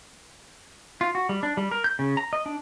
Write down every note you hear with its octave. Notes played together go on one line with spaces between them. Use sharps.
F4
F#4
G3
D4
G3
A#4
G6
C#3
A#5
D#5
D4